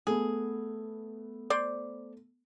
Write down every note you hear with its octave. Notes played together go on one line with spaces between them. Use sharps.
A3 B3 G#4
C5 D5